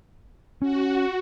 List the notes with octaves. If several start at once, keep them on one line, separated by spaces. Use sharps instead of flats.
C#4 F#4